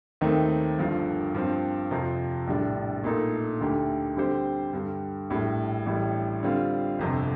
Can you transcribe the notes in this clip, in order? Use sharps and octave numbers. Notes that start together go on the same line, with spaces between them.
D#2 D#3 A3 C4 D#4
G1 G2 F3
G2 F3 C4
F2 C3 F3
A#1 A2 G3 D4
A#2 A3 D#4 A4
D2 D3 A3 D#4 G4
D3 G3 C4 G4 C5
G2 D3 G3
A#1 A2 G3
A1 A2 G3
D3 G3 C4 F4
G1 F2 C3